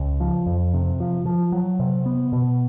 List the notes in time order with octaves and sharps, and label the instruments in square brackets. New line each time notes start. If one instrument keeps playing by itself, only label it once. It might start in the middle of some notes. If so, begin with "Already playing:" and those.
Already playing: [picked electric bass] C#2
F3
F2
C3
F3
F3
F#3
C3
B3
B2